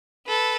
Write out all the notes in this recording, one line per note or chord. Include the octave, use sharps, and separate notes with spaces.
A4 B4